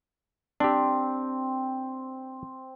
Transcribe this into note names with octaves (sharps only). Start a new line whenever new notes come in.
C4 D4 G4